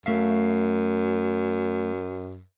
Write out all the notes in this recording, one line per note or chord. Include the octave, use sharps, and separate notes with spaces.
F#2 A3 E5 F5